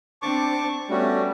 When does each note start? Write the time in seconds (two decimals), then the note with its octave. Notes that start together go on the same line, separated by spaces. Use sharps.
0.22 C4 D4 A5 C#6 D6
0.90 G3 A3 B3 C#4 F#4